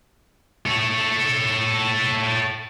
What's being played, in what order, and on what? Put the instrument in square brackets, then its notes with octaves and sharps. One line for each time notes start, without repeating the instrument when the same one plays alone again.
[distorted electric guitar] A4 C#5